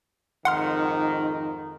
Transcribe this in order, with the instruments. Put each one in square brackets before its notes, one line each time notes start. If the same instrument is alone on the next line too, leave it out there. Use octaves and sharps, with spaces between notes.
[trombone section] F2 G#2 D#3 [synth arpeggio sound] F#5 C6 F6